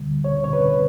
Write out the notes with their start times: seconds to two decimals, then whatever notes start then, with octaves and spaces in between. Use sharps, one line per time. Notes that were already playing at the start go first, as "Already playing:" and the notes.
Already playing: D2 D3 G3
0.24 C#5
0.44 C#5
0.53 B4